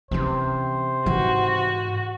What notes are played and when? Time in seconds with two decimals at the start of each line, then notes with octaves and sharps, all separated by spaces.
0.11 C3 E3 C#4 C5
1.06 G#2 E3 F#4